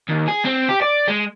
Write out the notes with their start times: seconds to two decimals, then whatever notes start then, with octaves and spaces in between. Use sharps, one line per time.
0.09 D#2
0.28 G#4
0.45 C4
0.69 G4
0.81 D5
1.08 G#3